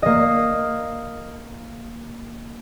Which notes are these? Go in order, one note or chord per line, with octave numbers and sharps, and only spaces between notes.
A#3 D#5